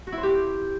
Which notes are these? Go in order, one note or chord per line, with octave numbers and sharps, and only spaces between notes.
F#4
E4
C5
G4